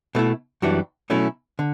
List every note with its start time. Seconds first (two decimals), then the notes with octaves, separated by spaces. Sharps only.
0.15 B2 A3 E4
0.62 F#2 E3 G3 D4 F#4
1.10 B2 F#3 A3 C#4 E4
1.59 D3